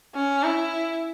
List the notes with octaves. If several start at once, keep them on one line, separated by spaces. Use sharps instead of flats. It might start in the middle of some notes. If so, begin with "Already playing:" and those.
C#4
E4